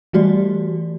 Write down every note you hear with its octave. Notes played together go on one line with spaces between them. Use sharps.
E3 G3 A3 F#4 G4 D5